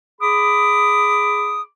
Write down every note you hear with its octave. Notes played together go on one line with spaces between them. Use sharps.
G#4 B5 D6 D#6